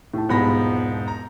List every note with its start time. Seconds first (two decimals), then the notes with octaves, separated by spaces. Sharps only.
0.14 A2 A5
0.29 E1 C2 G#2 F3 B3 B5 A#6
1.08 A#5